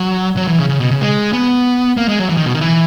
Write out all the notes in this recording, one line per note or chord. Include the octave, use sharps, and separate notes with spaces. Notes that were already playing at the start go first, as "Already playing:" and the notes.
Already playing: F#3
F#3
E3
C#3
C#3
B2
C#3
G#3
B3
A#3
G#3
F#3
E3
D#3
B2
D#3
E3